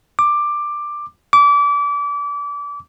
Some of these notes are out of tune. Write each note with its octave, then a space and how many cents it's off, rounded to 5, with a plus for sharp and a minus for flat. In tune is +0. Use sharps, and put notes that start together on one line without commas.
D6 +10
D6 -30